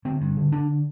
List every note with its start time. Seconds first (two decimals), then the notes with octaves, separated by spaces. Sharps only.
0.05 D3 C4
0.21 G2
0.37 D3
0.52 D3 D4